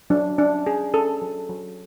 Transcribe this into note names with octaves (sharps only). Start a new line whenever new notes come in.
F#3 D4
C#4 D4
C#4 G#4
C#4 A4
F#3
F#3